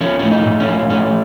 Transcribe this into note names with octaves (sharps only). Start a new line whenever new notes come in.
F3 C#4
A2 C#4
D#4
A2
C#4
F3
A2 C#4